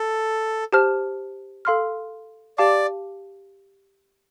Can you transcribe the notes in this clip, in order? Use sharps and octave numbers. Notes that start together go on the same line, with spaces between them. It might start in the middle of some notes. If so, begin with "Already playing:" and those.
Already playing: A4
G4 C5 A5 F6
A4 F5 C6 F6
G4 D5 F5 A5 D6